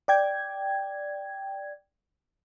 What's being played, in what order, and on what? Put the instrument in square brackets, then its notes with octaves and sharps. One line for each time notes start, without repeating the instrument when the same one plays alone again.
[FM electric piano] D5 G5 G#6